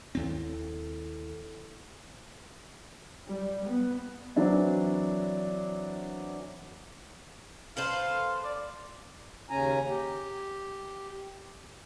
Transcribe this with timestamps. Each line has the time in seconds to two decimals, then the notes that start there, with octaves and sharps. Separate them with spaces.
0.15 D#2 C4 E4 A4
3.27 G3
3.64 B3
4.36 E3 F#3 C4 D4 E4
7.77 A4 B4 C5 F5
8.44 D5
9.50 D#2 C#3 C#4 G#5 A#5
9.89 G4